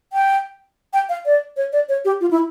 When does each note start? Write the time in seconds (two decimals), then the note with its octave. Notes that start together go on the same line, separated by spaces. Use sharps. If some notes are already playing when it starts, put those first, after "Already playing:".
0.13 G5
0.93 G5
1.09 F5
1.26 D5
1.57 C#5
1.73 D5
1.89 C#5
2.05 G4
2.21 F4
2.31 E4